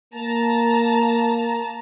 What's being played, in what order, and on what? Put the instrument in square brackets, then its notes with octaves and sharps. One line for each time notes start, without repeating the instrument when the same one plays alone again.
[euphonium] A#3 [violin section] A5 A#5